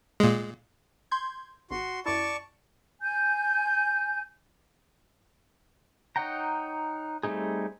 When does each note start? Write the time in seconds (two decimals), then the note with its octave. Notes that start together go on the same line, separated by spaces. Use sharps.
0.20 A#2 G#3
1.11 C6 G6 G#6
1.71 G#1 F#4 C6
2.06 F#2 E4 D5 A5 C#6
3.01 G#5 G6
6.16 D#4 C#5 F#5 G5 A#5
7.23 G3 A3 C4 D#4 G#4